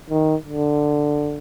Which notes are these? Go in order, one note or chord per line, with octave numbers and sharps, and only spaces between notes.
D#3
D3